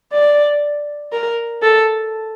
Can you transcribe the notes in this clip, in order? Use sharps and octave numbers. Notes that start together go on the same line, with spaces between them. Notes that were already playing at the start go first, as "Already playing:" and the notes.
D5
A#4
A4